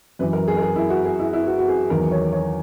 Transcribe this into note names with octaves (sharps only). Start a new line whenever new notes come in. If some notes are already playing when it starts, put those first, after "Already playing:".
F#2 E3 B4
A#4
G#4
A#4
G#4
E4
F#4
G#4
E4
E4
F#4
F#4
G#4
E2 D#3 F#3 A#4
C#5
C#5